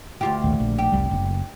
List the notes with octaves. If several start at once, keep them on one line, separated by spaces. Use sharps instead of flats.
D2 F4 G4
A#1 D#2 A2
A#1
G4
F1 C2 G3
F#1